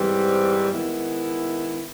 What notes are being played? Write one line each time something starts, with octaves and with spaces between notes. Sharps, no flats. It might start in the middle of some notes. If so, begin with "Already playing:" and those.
Already playing: G#2 E3 G3 C4
D#3 G#3 B3 E4